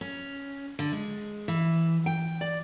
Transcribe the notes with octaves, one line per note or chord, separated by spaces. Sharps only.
C#4
D3
G#3
E3
G5
D5